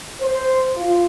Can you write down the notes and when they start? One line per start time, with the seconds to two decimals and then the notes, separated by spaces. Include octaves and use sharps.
0.21 C5
0.76 F4